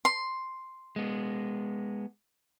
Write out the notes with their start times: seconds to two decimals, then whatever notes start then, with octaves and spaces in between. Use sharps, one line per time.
0.05 C6
0.96 G#3 B3